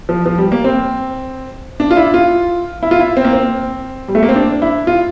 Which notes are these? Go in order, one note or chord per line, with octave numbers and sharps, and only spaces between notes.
F3
F3
G3
A#3
C4
D4
F4
E4
F4
E4
F4
E4
C4
A#3
C4
G3
A3
A#3
C4
D4
E4
F4